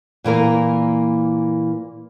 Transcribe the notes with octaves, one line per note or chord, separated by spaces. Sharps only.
A#2 E3 A#3 A#4